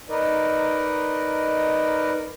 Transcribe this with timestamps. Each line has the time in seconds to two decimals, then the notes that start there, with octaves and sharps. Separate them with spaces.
0.09 D#4 A#4 B4 D5 D#5